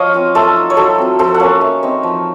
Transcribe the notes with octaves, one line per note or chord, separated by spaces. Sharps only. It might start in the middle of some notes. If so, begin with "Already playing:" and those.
Already playing: F3 C#5 D#5 F5
C4 F4
A3 A4 C5
D#4
C#5
F#3 A4 C5
C4 F4
F3 A4 C5
F#5
A#3 C#4 C#5 F5
A3
C4 D#4
F3